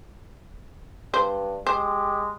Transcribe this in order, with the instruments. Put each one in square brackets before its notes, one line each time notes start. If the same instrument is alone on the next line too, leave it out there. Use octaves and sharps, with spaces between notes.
[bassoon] G2 [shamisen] C5
[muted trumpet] G#3 [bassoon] G4 [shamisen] C5